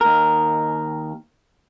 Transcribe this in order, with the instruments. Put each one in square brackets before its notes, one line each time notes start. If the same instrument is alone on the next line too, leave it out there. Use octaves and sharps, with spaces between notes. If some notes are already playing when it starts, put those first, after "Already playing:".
[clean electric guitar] D#2 A#4